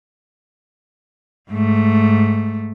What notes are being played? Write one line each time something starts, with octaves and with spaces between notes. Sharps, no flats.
G#2 A3